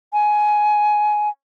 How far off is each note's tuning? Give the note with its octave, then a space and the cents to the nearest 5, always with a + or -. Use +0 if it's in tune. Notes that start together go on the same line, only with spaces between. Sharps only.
G#5 +15